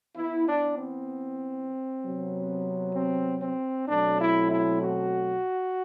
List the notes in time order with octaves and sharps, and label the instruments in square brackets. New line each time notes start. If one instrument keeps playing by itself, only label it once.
[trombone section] E3 B3 E4
D4
C4
C3 F#3 B3
C4
C4
B2 F#3 A3 C4 D4
E4
E4
F#4